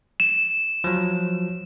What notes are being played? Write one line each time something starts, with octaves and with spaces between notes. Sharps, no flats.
E7
F3 F#3